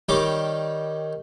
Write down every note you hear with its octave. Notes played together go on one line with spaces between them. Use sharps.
D#3 G3 G4 C#5 D6